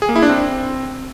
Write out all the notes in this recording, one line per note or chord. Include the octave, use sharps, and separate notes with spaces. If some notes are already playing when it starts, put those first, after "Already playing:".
G#4
A#3
E4
D4
C4